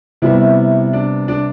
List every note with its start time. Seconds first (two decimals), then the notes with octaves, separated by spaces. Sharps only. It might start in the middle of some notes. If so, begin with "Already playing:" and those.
0.22 C3 G3 B3 E4
0.93 D4
1.28 D4